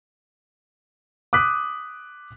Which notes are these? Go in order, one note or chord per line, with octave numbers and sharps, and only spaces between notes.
D6 D#6 F#6 B6